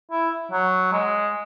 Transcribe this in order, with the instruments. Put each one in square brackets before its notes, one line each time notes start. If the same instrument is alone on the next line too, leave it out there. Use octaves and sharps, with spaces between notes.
[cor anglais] E4
F#3
G#3